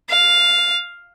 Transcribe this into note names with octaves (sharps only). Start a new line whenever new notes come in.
F5